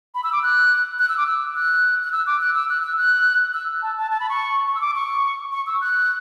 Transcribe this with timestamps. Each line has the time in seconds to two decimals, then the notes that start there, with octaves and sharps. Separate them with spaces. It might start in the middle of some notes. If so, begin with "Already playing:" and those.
0.15 B5
0.24 E6
0.33 D6
0.43 F#6
0.99 F#6
1.09 E6
1.17 D6
1.27 E6
1.55 F#6
2.04 F#6
2.12 E6
2.27 D6
2.41 F#6
2.55 E6
2.69 F#6
2.83 E6
2.98 F#6
3.54 E6
3.82 A5
3.97 A5
4.11 A5
4.20 B5
4.29 C#6
4.68 C#6
4.75 E6
4.81 D6
4.95 C#6
5.52 C#6
5.67 E6
5.81 F#6